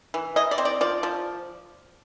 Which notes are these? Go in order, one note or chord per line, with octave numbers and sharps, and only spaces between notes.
E3
E4 D#5
D5
C4
D5
F3 D5
F3